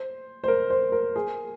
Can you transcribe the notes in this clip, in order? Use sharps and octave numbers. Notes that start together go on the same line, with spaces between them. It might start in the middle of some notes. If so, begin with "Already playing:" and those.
Already playing: C5
C5
A#4
C5
A#4
G#4